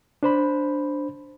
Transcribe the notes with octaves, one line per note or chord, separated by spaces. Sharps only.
D4 C5 B5